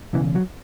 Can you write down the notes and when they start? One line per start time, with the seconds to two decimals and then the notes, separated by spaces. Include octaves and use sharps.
0.13 E1 E2 C#3 E3
0.35 F#3